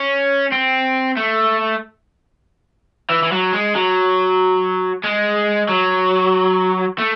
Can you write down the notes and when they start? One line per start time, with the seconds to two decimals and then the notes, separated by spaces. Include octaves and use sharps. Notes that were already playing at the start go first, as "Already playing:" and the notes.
Already playing: C#4
0.52 C4
1.17 A3
3.10 E3
3.24 E3
3.32 F#3
3.53 G#3
3.75 F#3
5.04 G#3
5.69 F#3
6.98 A3